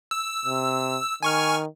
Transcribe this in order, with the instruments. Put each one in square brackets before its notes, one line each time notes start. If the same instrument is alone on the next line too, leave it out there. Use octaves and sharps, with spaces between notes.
[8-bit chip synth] E6
[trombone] C3
[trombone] D#3 [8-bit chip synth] G#5 C#6 F6